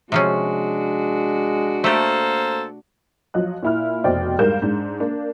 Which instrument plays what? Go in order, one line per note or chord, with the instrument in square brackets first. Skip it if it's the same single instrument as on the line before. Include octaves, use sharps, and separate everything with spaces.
[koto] C3 F3 C#4 [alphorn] G#3 [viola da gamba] D4 F#4
[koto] A3 G4 [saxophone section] A#3 A4 C5
[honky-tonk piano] F3 F#3 D#5 F#6
A#2 E4 F6
F1 B2 C5 D5 D#5 G5
G#2 G3 A#4 F5 G6 E7
G#2 D4
A#3 D4